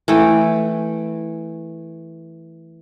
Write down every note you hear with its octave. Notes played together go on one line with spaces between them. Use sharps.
E3 A3 G5